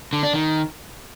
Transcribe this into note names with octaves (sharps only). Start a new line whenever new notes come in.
D3
D4
D#3